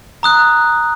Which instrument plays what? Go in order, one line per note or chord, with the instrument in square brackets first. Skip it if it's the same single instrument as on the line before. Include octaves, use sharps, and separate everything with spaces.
[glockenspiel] A#5 D#6 F#6